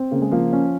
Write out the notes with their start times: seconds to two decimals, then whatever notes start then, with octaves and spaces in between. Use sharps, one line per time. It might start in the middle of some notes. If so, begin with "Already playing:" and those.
Already playing: C4
0.11 C#3 A#3
0.22 G#3
0.31 F3 A#3
0.53 C#4